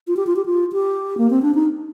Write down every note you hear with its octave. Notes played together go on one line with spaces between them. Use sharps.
F4
G4
F4
G4
F4
G4
A#3
C4
D4
D#4